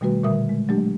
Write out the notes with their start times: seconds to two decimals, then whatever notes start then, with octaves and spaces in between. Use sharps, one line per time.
0.01 B2 D#3 G3 A3 F#4 B4
0.23 A#2 D3 G3 A#4 E5 D#6
0.49 G#3
0.69 F#3 G#3 A3 D4 G4